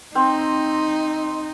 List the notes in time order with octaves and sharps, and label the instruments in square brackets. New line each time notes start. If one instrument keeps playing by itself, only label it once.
[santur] C4 [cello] D#4